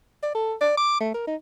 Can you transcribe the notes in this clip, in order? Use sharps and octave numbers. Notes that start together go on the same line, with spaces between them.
D5
A4
D5
D6
A3
A#4
D#4